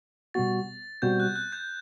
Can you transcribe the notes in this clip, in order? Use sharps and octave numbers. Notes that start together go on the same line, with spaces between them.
B2 G3 B3 F#4 A6
B2 G3 C4 F#4 G6
F#6
F#6
G6